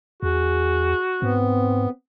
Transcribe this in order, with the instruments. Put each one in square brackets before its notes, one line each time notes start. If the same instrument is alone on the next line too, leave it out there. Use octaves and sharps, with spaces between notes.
[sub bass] E2 [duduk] F#4 [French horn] G#4
[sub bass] G#2 [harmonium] B3 [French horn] C4